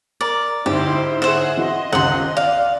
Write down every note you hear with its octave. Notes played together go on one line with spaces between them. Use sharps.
A#4 D5 A#5
D2 G#2 D#4 E4 G4 C5
G#4 C5 C#5 E5 F#5
E3 F#4 D#5 C6
G#1 C#2 G4 F#5 C6
D5 F5